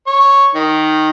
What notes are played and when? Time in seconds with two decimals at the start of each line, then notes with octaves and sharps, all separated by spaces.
0.07 C#5
0.55 D#3